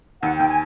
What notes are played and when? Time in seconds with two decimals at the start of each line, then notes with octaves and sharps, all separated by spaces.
0.22 D#2 F#5
0.36 G5
0.40 D#2
0.48 G#5